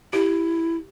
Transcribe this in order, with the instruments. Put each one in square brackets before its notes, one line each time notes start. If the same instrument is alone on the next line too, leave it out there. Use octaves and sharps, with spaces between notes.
[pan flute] E4 [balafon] G4